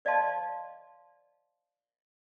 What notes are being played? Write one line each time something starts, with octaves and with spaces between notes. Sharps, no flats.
C5 D5 D#5 F5 A5 C6